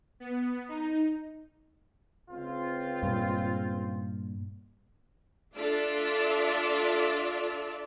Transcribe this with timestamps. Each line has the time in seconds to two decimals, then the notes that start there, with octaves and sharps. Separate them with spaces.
0.20 B3
0.69 D#4
2.31 C#2 C4 F4
3.03 G2 A#2
5.56 D4 F4 A4 D5 E5